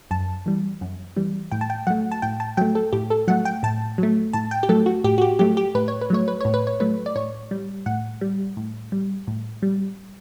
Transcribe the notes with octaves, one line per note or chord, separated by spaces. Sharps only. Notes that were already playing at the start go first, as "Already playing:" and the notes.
F#2 A5
E3 G3
F#2
E3 G3
A2 G5
A5
G5
F#3 A3 F#5
A5
A2 G5
A5
F#3 A3 G5
A4
A2 G4
A4
F#3 A3 F#5
G5
A2 A5
F#3 A3
A2 A5
G5
G4
F#3 A3 A4
F#4
A2 G4
F#4
G4
F#3 A3 G4
G4
A2 B4
C#5
B4
F#3 A3 C#5
B4
A2 C#5
B4
C#5
F#3 A3 B4
D5
A2 C#5
G3
A2 F#5
G3
A2
G3
A2
G3